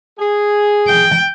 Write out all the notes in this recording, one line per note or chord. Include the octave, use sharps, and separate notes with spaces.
G#4
G5